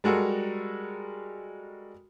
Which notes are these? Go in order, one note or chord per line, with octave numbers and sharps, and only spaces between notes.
G3 G#3 F#4 A4 A#4